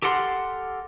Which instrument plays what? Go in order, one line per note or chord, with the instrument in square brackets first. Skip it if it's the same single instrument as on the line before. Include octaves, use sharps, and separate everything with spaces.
[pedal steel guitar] G4 A4 A#4 F#5 C6